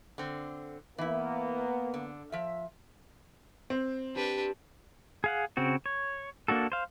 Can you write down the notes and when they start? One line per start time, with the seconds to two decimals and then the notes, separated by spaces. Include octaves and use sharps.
0.18 D3 C4
0.98 E3 A#3 B3 E4
1.94 D3
2.32 F3 E5
3.70 C4
4.16 D4 G4 B4
5.24 G#4 F5 F#5
5.57 C#3 C4 F#4
5.86 C#5
6.48 A#3 D4 F#4 A4
6.72 C5 F5